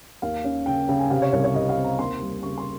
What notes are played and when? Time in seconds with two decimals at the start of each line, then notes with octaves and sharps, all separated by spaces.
0.22 D#2 F5
0.44 C#4
0.66 C#3 G5
0.89 C#3 G5
0.99 G#5
1.10 C3 F5
1.22 C#5
1.32 C2 C#5
1.44 C#5
1.54 C3 D#5
1.69 F5
1.77 C4
1.84 A#5
1.98 D#2 C6
2.21 G3
2.43 C#3 C#6
2.58 C6